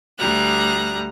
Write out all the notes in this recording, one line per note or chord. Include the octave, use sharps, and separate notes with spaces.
D2 G3 A#5 F#6